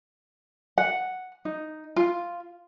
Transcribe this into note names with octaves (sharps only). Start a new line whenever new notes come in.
F#5
D#4
F4